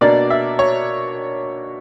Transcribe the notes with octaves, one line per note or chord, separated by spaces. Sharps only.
B2 A#3 D4 D5
E5
C#5